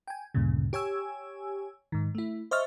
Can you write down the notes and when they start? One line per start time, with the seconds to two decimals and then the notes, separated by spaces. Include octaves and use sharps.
0.07 G5 G#5
0.34 D2 G2 A#2 C#3
0.73 G4 C#5 G#5 E6
1.92 G#2 D#3
2.15 A3 E4
2.51 C5 D#5 E5 C#6 F6 A6